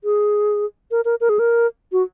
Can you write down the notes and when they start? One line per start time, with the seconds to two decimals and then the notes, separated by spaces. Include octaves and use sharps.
0.04 G#4
0.91 A#4
1.05 A#4
1.21 A#4
1.29 G#4
1.39 A#4
1.92 F#4